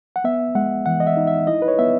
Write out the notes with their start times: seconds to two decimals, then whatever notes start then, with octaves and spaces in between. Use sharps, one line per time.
0.16 F#5
0.24 B3 E5
0.55 G#3 F#5
0.86 E3 F#5
1.00 D#5
1.07 E5
1.17 D#4
1.27 E5
1.47 E4 D#5
1.62 B4
1.68 C#5
1.79 B3 E5